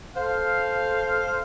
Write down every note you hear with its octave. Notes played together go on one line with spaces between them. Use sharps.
A4 C5 F5